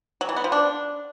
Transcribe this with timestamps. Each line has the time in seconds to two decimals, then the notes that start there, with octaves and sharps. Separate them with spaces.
0.21 F#3
0.29 E3
0.36 B3
0.44 F3
0.52 D4